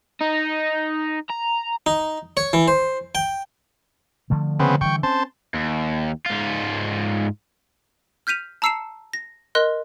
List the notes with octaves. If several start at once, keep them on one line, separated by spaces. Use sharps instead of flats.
D#4
A#5
D#4
C#5
E3
C5
G5
D3 F3 A3
C#3 B3 C4
D3 E3 G3 G5 C#6
C4 C#4 C5 A5
D#2
G#2 F4
F6 G6 B6 D#7 F7
A5 A#5 E6 C7 C#7 E7
A#6
A#4 D#5 C6 F#6